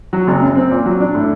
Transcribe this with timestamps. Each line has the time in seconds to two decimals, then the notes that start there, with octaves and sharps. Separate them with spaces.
0.13 F#3
0.27 F#1
0.41 F#2
0.56 C4
0.70 A#2
0.85 F#3
1.00 D4
1.15 A2